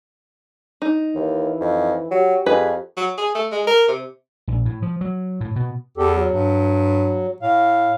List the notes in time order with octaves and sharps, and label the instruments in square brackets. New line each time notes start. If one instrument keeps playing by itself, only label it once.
[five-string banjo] D#4
[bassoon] D#2 [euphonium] E3
[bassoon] F2
[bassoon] F#3 [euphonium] G4
[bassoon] F2 [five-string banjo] G#4 B4
[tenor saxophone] F#3
G#4
A3
G#3
A#4
C3
[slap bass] A#1
A2
F3
F#3
A2
B2
[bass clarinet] E2 [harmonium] G4 A4
[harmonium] F#3
[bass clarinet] G2
[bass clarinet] A2 [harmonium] F5